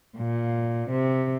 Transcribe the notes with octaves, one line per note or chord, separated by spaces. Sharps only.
A#2
C3